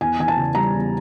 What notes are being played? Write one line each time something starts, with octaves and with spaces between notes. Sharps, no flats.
E2 G#5
E3 G#5
A5
C#3
G3 A#5
E2